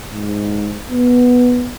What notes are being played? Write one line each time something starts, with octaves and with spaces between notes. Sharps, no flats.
G#2
B3